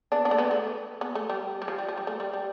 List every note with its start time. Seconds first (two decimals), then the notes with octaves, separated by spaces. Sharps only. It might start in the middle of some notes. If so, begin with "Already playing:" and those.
0.12 B3 D4
0.25 B3 D4
0.31 A3
0.38 B3
0.51 A3
1.01 B3
1.15 A3
1.30 G3
1.62 G3
1.68 F3
1.78 G3
1.89 F3
1.97 G3
2.07 A3
2.20 G3
2.33 G3